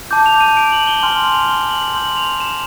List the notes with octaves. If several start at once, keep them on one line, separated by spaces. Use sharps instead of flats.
A5 D6 G6
F7
D#7
D7
F#7
G7
G#5 C6 F6 F#7
F#7
F7
G7
F#7
C6 E6 G6 F#7
F7
E7